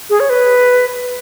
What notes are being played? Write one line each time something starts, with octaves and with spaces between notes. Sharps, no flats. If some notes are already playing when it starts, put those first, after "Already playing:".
G#4
C#5
B4